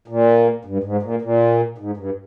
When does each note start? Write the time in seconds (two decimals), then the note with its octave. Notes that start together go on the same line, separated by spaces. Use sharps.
0.08 A#2
0.65 G2
0.84 G#2
1.02 A#2
1.22 A#2
1.78 G#2
1.97 G2